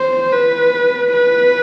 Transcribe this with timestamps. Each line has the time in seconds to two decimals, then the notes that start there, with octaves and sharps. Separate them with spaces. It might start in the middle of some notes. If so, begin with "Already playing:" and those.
Already playing: C5
0.32 B4
1.12 B4